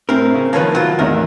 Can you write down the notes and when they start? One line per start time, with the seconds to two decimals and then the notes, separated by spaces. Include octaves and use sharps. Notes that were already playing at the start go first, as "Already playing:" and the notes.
0.09 A2 C4 A#4
0.34 C#3
0.53 D#3 F3 A#3 B4 C#5 A5
0.75 F#3 F4
0.99 G#1 E2 A2 D#3 A#4